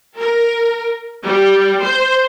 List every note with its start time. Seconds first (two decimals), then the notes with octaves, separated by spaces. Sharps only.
0.19 A#4
1.22 G3
1.81 C5